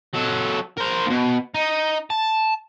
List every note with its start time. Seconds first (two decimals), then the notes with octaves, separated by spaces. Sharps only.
0.13 F#3 A4
0.77 A#4 C5
1.06 D#2 B2
1.54 D#4
2.10 A5